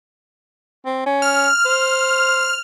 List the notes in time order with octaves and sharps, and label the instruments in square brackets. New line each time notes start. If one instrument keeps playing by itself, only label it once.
[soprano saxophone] C4
C#4
[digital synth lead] F6
[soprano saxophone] C5